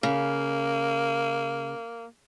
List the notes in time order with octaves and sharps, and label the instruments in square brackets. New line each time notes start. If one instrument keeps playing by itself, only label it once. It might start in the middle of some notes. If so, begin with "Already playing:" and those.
[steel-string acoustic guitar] C#3 [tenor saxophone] A#3